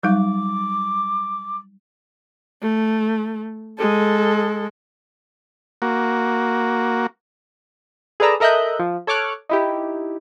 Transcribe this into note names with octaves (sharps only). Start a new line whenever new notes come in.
F#3 G3 D#4 D6
A3
G#3 A4
A#3 F#4
G#4 A4 B4 D5 A#5 E6
A4 A#4 D#5 E5 F#6 G6
F3
A4 C#5 C#6 D6 F6 F#6
D#4 E4 G4